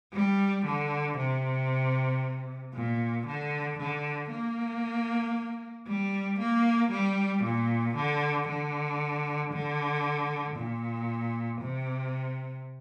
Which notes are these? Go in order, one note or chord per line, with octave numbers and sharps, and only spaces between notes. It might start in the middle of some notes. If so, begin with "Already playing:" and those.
G3
D3
C3
A#2
D3
D3
A#3
G3
A#3
G3
A#2
D3
D3
D3
A#2
C3